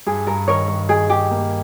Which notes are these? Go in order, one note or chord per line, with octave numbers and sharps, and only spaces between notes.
G2 G#4
G2 A#4
D#3 A#4 C#5
G2
D#4 G#4
D#3 G4
A#3